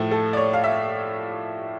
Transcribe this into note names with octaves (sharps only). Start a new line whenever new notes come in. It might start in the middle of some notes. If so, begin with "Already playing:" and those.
Already playing: A2 F3 A3
A4
D5
C#5
F5
E5